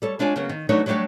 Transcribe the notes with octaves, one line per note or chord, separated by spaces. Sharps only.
G3 A4 C#5
G#3 D4 F4 C#5 G#5
C#3 F#3 A#3 B3 C#4
D#3
E3 F#3 A3 D4 D#4 C#5
F#3 G3 A3 D4 G4 C#5